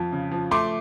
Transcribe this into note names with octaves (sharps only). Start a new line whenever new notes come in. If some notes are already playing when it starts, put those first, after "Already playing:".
Already playing: F2 F3
C#3
F3
A3 C6 D6